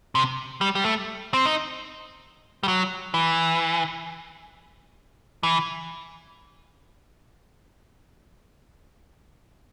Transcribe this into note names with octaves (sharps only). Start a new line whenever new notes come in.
C3
G3
G3
A3
C4
D#4
G3
F#3
E3
E3